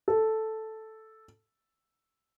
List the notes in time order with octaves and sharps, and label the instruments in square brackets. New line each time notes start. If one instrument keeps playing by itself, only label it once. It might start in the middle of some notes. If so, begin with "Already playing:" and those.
[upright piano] A4